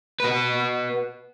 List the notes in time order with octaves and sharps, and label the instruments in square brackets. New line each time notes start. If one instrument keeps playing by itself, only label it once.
[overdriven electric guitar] F#4 B4